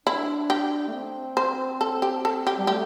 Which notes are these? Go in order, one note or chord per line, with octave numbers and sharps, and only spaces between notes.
D4 E4
G4
A3
C4
C5
A4
G4
A4
G4
G3
A3 G4